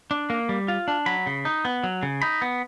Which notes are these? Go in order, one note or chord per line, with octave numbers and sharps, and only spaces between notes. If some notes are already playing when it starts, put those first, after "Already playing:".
D4
A#3
G3
F4
D4
F#3 B5
C#3
D#4
B3
F#3
C#3
D#4 B5
B3